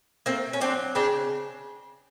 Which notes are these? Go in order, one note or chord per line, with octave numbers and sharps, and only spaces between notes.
A3 A#3 C4
C#4
F#3 C4 D4
C#3 C4 D4